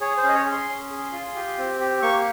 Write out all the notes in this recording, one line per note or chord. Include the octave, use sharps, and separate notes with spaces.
G#4 C#5
C5
C#4 D#5
C#5
G#4
C6
C#4
G#4
F4
G4
C4
G4
A#3 C#6